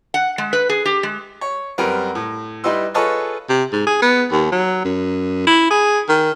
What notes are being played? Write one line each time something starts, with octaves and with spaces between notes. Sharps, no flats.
F#5
G#3
B4
G#4
G4
G#3
C#5
F#2 G3 C4 A#4 B4
A2
G3 D#4 E4 B4 C6 E6
F4 G#4 A4 B4 C#5 D#5
C3
G#2
G#4
B3
D#2
F#3
F#2
E4
G#4
D#3